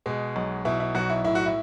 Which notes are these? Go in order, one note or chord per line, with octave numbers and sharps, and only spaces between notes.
B2 G#3
B1
B2 E4
E4
B1 F#4
E4
A2 E4
F#4
E4